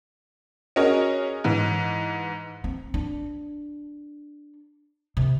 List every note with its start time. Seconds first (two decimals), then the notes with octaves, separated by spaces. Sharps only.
0.76 C#4 F#4 G#4 A#4 C#5 D#5
1.44 G#2 E3
2.64 C4
2.94 D4
5.17 C3